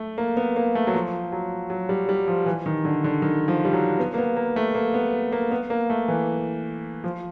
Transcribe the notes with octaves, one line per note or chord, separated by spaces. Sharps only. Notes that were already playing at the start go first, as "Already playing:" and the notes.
Already playing: A3
A#3
B3
A#3
A3
F#3
F3
F#3
F#3
G3
G3
F3
E3
D#3
D3
D3
D#3
F3
G3
F#3
B3
A#3
B3
A#3
A3
A#3
B3
A#3
B3
A#3
A3
E3
F3